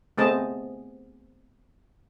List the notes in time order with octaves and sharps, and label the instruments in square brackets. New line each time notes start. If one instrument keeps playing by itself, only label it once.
[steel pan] A3 B3 C4 G#4 D#5 A5